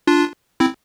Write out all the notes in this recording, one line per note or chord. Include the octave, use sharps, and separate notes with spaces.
D4 F4
C4 E4